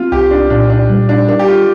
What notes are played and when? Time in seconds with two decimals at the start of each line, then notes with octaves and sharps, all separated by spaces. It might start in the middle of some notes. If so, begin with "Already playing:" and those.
Already playing: C4 F4
0.12 C2 G4
0.31 D4
0.50 A#2 D4
0.70 D4
0.90 G3
1.09 D4
1.28 D4 A#4
1.39 G4
1.48 F4